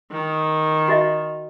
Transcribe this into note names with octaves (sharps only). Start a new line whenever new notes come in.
D#3
F#4 D#5 E5